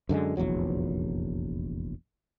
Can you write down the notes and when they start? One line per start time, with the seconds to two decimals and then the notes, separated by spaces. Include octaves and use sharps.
0.09 F#2 D3 F3 G#3
0.37 F1 A#1 E2 F#3